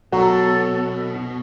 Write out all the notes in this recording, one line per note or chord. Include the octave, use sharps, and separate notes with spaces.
B2 F#3 F#4 A4